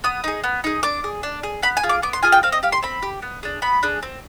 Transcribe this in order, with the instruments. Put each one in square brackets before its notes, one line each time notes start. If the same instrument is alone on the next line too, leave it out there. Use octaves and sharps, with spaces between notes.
[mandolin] B3 D#6
D#4 G#4
B3
D#4 G#4
D4 D6
G#4
D4
G#4
B3 B5
G#5
F4 G#4
D6
B3 D6
C6
F4 G#4 G#5
G5
C4 F5
D#5
G4 F5
C6
C4 B5
G4
B3
D4 G#4
B3 B5
D4 G#4
C4